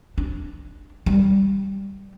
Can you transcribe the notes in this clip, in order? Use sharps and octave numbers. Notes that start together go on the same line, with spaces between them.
D4
G3